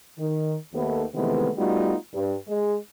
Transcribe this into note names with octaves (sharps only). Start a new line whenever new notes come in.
D#3
D#2 A3 B3
C3 D#3 E3 G#3 A3 B3
G3 A3 B3 D#4 F4 F#4
G2
G#3